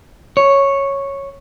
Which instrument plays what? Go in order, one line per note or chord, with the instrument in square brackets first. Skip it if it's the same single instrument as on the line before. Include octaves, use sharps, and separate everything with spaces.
[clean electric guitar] C#5